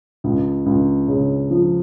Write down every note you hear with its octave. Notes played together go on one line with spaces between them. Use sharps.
C#2
C#2
C#3
F3